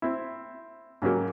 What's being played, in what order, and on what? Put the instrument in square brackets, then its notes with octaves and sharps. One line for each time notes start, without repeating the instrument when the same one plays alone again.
[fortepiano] C4 E4
G#2 C#3 F#3 A#3 G4